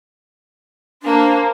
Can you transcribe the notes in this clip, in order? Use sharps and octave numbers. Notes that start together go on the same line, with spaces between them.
A#3 D4 C5